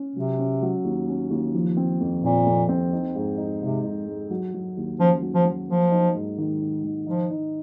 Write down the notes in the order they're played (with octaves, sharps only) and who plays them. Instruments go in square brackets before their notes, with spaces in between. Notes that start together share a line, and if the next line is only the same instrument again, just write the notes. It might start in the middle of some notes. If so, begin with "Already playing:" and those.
Already playing: [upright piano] C#4
[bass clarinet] C3 [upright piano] F#3
[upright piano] C#4
F#3
D#2
C#4
D#2
F3
C4
F2
[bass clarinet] A#2 [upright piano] C4
[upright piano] F2
C4
D#4
G#2
D#4
[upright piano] G#2 [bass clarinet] C3
[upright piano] D#4
G#3
F#3
F#3
D#2
[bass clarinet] F3 [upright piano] C#4
[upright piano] F#3
[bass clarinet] F3
[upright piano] F#3
[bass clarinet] F3 [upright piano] A#3
[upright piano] D#4
G#2
D#3
D#4
D#3
[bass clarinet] F3 [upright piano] D#4
[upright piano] D#4